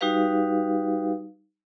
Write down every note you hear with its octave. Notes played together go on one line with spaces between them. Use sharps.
G3 D#4 F#4 G4 B4 F5